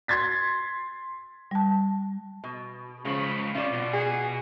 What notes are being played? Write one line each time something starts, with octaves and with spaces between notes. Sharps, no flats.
C6 G#6 A6 B6
G3 A5
B2
C#2 C#3 F3 C#5 B5
G3 C#4 F4 D5
B2
G#4